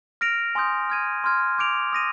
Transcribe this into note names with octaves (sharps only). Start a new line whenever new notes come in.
F6 A#6 D7 F7
G#5 C6 D#6 G6
F6 G#6 D#7
C6 F6 G#6
D6 G6 D7 F7
D#6 A#6 D#7